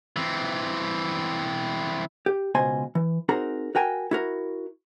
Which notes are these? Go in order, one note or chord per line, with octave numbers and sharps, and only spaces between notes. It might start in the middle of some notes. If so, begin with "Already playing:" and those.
E3 C4
G4
C#2 B2 C5 D#5 G#5 C6
E3
C4 D#4 F#4 G#4 A#4 A#5
F#4 A#4 G5 G#5
E4 F#4 A#4